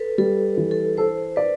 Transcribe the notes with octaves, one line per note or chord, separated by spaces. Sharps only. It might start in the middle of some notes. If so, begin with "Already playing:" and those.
Already playing: A4 B4
G3 A4
E3
A4
A4 C5
B4 D5